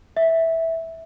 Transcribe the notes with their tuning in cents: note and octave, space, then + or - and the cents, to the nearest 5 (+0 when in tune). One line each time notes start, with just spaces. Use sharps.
E5 -10